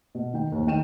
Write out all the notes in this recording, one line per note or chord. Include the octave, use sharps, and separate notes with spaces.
B2
D#3 G5
D#2 C#5
D#3 G5 D#7 E7